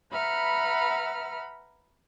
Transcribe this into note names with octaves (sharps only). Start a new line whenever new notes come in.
B4 E5 F#5 A#5 B5 F6